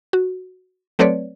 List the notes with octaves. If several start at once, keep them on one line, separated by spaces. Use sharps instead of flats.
F#4
F#3 A3 C4 B4 C#5 D5